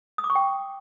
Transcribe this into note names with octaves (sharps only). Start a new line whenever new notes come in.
D#6
D6
C#6
G5